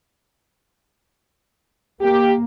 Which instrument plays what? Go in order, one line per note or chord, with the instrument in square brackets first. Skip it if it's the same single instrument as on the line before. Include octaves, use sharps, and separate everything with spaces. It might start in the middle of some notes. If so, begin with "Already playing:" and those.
[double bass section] A#3 [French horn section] G4